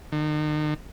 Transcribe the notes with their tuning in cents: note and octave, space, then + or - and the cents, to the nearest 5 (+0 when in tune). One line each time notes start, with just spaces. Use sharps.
D#3 -40